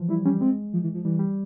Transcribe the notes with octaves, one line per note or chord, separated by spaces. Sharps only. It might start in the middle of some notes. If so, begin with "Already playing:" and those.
Already playing: E3 F3
G3 E4
G3 C#4
G#3 C4
F3
E3
F3
E3 G3
G3